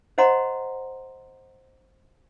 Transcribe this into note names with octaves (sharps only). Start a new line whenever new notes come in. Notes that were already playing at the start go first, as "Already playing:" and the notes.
C5 D#5 F#5 A#5 C6